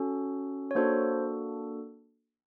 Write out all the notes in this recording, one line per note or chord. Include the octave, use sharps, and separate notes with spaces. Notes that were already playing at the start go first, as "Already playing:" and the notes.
Already playing: C#4 F#4 A4
C#5
A#3 D4 F#4 A4 C5